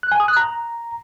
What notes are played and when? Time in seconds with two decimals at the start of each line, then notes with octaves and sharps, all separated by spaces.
0.03 F#6
0.12 G#5
0.20 D#6
0.28 F#6
0.37 A#5